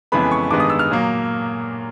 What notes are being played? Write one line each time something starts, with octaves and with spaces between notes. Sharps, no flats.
F2 C#3 E3 G#3 B3 B5
C#6
G2 D#3 G#3 B3 D6
D#6
E6
F6
A#2 F#3 A#3